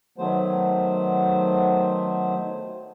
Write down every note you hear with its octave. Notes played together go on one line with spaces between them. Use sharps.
D#3 F#3 A3 B3 C5